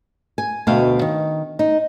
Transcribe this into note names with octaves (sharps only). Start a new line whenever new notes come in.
G#5
D2 B2 B4 E5 F5 G5
D#3
D#4